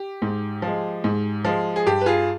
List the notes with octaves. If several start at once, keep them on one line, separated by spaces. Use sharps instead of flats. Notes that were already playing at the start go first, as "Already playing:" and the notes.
Already playing: G4
G#2
F3
G#3
G#2
F3 G#3
G#4
G2 G4
B4
F4 G#4